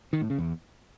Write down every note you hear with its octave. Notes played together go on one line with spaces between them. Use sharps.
D#3
A2
C#3
E2